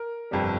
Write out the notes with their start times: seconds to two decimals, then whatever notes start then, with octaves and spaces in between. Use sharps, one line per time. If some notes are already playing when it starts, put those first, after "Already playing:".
Already playing: A#4
0.31 G1 F2 C3 G3